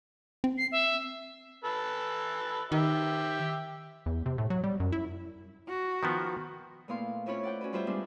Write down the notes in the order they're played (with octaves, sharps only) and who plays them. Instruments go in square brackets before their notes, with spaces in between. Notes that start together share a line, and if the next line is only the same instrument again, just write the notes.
[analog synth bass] C4
[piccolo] C7
E5
[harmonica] A4 B4 E6
[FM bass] D#3 [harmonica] G4 E5
[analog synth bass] E2
C3
A2
F#3
G3
F#2
E4
[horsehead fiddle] F#4
[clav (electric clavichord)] D#3 F3 B3
[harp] A#2 A3 B3 E4 F5 C6
C4 C#4 E4 F4 B4 C#5
D5 F#5 G5
C#4 F#4 B4
G3 F4 B4 C5 E5 G5
G3 G#3 B3 C4 D4